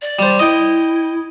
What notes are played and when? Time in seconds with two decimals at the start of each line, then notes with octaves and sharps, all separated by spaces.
0.02 D5
0.19 G3 C5
0.39 E4 D#5 G5